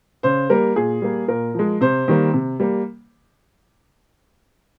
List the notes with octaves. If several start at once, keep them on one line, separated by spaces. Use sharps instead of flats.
C#3 C5
G3 A#3 A#4
A#2 G#4
G3 A#3
A#2 A#4
F3 G#3
C3 C5
D#3 G3 A#3
C3
G3 A#3